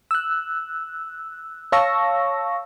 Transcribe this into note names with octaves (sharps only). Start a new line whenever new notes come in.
E6 F#6
C#5 F5 A5 C#6 E6 A#6